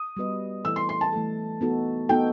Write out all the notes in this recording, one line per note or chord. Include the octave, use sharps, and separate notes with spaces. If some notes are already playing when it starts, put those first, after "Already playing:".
Already playing: D#6
G3 B3 F#4 B4 D#5
E3 A3 E4 A4 E6
C6
C6
A5
E3 A3 E4 A4
B3 D#4 F#4 A4
B3 D#4 F#4 A4 G5